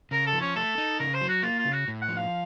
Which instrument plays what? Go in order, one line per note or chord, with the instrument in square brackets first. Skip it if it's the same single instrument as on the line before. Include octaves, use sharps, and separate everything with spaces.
[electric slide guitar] C#3 [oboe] A#4
[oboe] A4
[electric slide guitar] F3
[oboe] C#4
[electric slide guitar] A3 [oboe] A4
[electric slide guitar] D#4
[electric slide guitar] C#3 [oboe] A#4
[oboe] C5
[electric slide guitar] F#3
[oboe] F#4
[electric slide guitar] A#3 [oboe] F4
[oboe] F4
[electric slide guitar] C#3
[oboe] F#4
[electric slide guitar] A2
[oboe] F#5
[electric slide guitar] F3
[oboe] F5